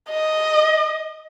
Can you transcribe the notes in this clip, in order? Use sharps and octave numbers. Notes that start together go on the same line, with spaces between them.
D#5